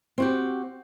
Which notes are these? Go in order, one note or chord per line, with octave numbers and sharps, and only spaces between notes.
C4 F#4 G4